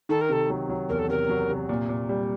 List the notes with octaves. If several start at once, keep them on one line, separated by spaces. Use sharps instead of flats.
D#3 A4
A#4
C3 A4
F#3
F#3
E2 A#4
A4
C3 A#4
F#3
C3
A#2
A#2
G3